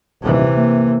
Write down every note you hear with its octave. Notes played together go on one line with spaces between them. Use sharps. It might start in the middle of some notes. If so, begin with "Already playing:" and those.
D#1 C3 E3
A#3